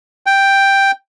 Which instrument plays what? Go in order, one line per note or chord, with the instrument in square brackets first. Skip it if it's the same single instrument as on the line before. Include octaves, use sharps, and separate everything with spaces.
[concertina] G5